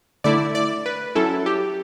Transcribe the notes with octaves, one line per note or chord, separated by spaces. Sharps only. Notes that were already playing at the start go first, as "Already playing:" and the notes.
D3 A3 E4 D5
D5
B4
F#3 C#4 E4 A4
G4